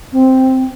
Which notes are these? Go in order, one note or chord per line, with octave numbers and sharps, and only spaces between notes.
C4